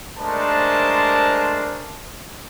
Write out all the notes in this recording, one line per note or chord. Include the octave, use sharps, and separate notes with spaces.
G#3 A3 D4 A#4 C5 A5